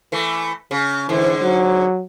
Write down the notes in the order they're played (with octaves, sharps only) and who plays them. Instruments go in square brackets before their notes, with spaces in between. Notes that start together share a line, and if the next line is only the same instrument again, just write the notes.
[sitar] E3 A3
C#3
[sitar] G#2 D3 [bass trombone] E3
[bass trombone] F#3